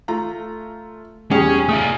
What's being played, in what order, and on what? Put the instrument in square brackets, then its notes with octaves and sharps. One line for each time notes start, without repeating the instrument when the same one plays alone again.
[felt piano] A3 F4 A#5
[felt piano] E2 B2 G3 [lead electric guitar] C#4 [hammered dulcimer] G#4
[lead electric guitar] A3 F4 [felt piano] E5 D#6